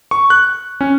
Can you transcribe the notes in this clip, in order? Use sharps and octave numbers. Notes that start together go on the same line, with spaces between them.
C#6
F#6
C#4